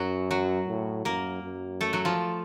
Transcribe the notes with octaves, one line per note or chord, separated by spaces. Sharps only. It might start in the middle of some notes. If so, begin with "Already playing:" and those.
Already playing: F#2 F#3 F#4
F#3 F#4
A2
F#2 A#3 A#4
F#2
A3 A4
F#3 F#4
F3 F4